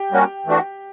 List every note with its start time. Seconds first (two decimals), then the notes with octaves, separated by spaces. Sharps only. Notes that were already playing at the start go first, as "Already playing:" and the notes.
Already playing: G4 G5
0.12 G3 A#3 C#4 F#4
0.46 E3 A3 D4 F#4